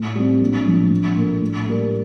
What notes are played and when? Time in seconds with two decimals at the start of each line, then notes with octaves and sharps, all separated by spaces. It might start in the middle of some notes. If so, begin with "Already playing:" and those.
Already playing: A2
0.15 G3 C4
0.41 A#1
0.66 A2 F3
0.91 A#1
1.16 A#2 A3
1.41 A2
1.66 G3 A#3